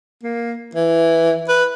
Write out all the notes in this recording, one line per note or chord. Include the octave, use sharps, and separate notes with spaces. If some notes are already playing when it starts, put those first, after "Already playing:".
A#3
E3
B4